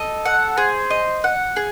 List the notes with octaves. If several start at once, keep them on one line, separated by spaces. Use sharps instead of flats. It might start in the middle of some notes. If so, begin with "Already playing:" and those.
Already playing: A4 D#5
F#5
G#4 C5
D#5
F#5
G#4